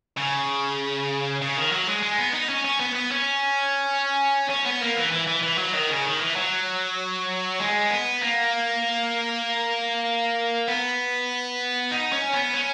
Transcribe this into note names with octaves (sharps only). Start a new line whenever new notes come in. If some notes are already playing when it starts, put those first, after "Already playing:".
C#3
C#3
D#3
F#3
G#3
G#3
B3
D#4
C#4
C#4
B3
B3
C#4
C#4
B3
A#3
E3
E3
E3
E3
F#3
D#3
C#3
D#3
E3
F#3
G#3
B3
A#3
B3
D#4
C#4
B3
C#4